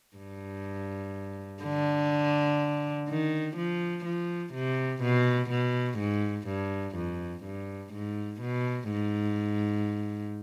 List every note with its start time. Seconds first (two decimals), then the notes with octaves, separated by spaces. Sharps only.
0.17 G2
1.63 D3
3.09 D#3
3.57 F3
4.05 F3
4.54 C3
5.02 B2
5.50 B2
5.99 G#2
6.48 G2
6.96 F2
7.44 G2
7.93 G#2
8.42 B2
8.91 G#2